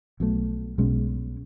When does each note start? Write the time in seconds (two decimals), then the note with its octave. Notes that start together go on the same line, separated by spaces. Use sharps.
0.20 B1 B2 F#3 A3
0.78 B1 B2 G#3 C#4